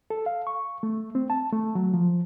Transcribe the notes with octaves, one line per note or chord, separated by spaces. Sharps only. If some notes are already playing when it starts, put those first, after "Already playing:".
A4
F5
C#6
A3
C4
A5
A3
F#3
F3